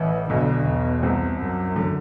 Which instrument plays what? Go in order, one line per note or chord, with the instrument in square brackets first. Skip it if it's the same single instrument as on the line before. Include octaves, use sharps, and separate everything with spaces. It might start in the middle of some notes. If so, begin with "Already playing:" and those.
Already playing: [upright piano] A1 A2 [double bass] E3
[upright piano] B1 B2 [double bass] D3
[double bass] E2
[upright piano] C2 C3
[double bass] F#2
[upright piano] D3